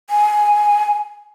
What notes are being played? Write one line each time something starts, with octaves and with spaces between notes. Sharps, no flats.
G#5